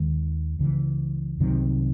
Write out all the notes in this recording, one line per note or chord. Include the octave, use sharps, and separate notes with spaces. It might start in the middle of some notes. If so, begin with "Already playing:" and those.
Already playing: D#2 D#3 G#3
C#2 C#3 E3
C2 C3 D#3 F#3